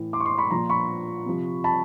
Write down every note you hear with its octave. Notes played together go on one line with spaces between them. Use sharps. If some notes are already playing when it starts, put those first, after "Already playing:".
Already playing: A2 E3
C6 D6
C#6
C6 D6
B5 C#6
A#2 F3 A#5 C6
B5 C#6
C3 F3
A5 B5